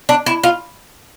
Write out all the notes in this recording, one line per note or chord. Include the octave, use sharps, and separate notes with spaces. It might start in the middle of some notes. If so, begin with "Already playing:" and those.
D4
E4
F4